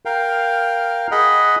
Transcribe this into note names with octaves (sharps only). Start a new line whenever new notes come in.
A#4 F5 G5
G#4 D#5 F#5 B5